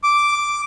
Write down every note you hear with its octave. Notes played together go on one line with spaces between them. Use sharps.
D6